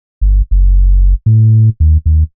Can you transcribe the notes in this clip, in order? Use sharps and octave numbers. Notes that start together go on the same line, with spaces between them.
G1
F#1
A2
D#2
D#2